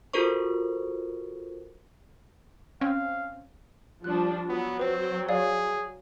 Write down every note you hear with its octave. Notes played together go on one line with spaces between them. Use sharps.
F4 F#4 A4 A#4 C5 C#6
C4 C#4 F5
F3 G3 D4 F#6
F#3 B3
C4 B4 C5
G#4 C#5 D5 F5